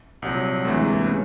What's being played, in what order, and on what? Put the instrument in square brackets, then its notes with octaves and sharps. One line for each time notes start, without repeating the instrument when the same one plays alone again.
[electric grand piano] C2 A#2 F#3
[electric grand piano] D2 C3 E3 [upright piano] A3
[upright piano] G#3
A#3
[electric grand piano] C#3 [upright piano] B3